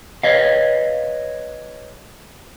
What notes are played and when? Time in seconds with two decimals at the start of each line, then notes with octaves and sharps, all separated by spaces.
0.23 B4 C#5 D#5 F5